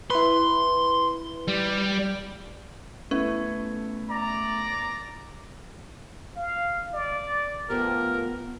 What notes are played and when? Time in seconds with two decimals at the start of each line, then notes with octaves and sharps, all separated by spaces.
0.10 E4 B4 C6
1.48 G3
3.11 A3 B3 C#4 E4
4.10 D5 A#5
6.36 F5
6.94 D5
7.70 F3 A3 B3 G4 A#4